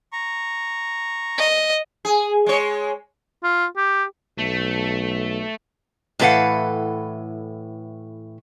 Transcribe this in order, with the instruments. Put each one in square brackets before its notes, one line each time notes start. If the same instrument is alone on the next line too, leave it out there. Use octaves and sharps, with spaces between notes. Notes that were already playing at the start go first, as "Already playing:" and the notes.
[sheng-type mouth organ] A#5 C#6
[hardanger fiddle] D#5
[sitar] G#4
G#3 C#5
[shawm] F4
G4
[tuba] B1 [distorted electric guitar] A3
[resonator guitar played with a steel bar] A2 E3 A4 B4 F5 F#5